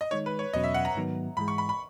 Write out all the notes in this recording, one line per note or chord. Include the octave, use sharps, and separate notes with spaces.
D#5
D#3 G#3 D#4 C#5
B4
C#5
E2 B2 F#3 C#4 D#5
E5
F#5
A#5
G#2 D#3 F#3 B3
G#2 E3 G#3 B5
C#6
B5
B5